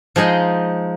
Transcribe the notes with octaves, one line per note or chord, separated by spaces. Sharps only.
F3 G#3 D#4 D#5 C6